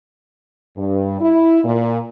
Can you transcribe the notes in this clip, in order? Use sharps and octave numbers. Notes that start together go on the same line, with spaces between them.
G2
E4
A#2